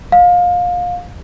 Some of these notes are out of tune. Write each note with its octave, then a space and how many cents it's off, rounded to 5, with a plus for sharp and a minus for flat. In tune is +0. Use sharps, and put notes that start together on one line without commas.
F5 +25